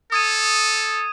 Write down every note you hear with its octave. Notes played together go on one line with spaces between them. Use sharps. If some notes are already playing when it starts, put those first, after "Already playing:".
A4 D#6 G#6 D#7